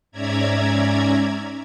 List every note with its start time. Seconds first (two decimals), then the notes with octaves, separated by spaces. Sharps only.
0.11 G#2 C#4 D5 E5 A#5 G#6